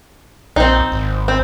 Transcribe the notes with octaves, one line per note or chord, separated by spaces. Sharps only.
A#1 C4 D#4
G#1
C4